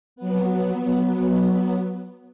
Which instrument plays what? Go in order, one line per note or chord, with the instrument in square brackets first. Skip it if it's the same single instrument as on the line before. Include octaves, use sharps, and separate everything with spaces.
[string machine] F#3 B3